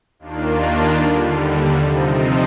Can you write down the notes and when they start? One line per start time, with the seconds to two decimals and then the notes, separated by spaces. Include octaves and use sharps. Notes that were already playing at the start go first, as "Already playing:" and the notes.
0.19 D#2 D#3 A#3 D4 F4
0.99 D#2 D3 G3
1.78 C3 F3 C4 D#4